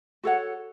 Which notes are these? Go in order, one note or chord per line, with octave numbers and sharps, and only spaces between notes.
F#4 A4 C#5 F#5